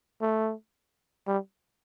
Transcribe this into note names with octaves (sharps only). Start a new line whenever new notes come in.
A3
G3